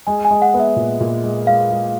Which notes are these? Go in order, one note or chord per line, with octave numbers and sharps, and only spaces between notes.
G#3 G#5
G#5
G#3
F#5
B3
E5
A#2
A#2
G#3
G#3 F5
G#3